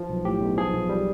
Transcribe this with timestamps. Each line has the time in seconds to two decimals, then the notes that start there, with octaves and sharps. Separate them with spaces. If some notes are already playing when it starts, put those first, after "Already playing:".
Already playing: F3
0.09 B1
0.25 A2 G4
0.40 B1
0.58 F3 G#4
0.74 B1
0.89 G3